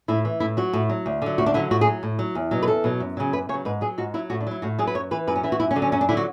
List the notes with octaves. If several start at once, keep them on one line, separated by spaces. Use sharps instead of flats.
A2 E4
E3
A2 E4
F#3 F#4
A2
F#3
D2
D3 F#3
D2 F#4
D4
D3 F#3 E4
A2 F#4
G#4
F#3
A2
F#3
E2
B2 F#3
B4
E2 A4
B2 F#3
F#2
C#3 F#3
F#2 B4
C#3 F#3 C#5
G#2 B4
F#3 G#4
G#2 F#4
F#3 E4
A2 F#4
D4
F#3 E4
A2 F#4
F#3 G#4
B4
F#2 C#5
E3 B4
F#2 B4
C#4
E3 E4
F#4
F#2 E4
C#4
D3 F#3
C#4
F#2 C#4
D4
D3 F#3 E4
F#4